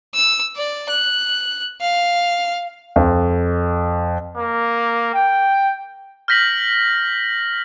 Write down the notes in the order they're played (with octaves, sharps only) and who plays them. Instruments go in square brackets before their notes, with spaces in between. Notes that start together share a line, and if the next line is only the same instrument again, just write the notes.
[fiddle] E6
D5
F#6
F5
[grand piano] F2
[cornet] A#3
G5
[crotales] F6 G6 A#6 B6 F#7